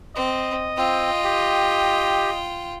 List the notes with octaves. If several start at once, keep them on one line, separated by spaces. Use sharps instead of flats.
C4 D#5
C4 F4 G5
G4